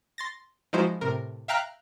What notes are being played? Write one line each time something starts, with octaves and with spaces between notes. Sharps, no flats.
C6 A6 A#6
F3 G#3 D#4 E4 F#4 C5
A2 C3 A#4
E5 F5 G5 A#5 F6 F#6